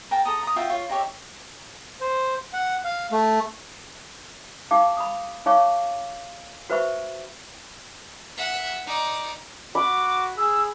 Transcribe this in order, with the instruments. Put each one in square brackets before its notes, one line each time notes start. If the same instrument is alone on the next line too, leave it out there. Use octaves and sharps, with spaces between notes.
[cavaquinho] A#4 G5 A5
A4 A#5 D#6
A#5 D#6
F4 F#4 E5 G5
F4 C#5
D#4 G4 C#5 E5
[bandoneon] C5
F#5
F5
A3
[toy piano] D#4 G4 F5 D6
B5 D#6
D#4 G#4 C#5 F5 C#6 D6
F#4 B4 C5 E5 B5 C#6
[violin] E5 F#5
D#4 D5
[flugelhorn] F#4 [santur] B5 [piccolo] D6
[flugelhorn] G#4 [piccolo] E6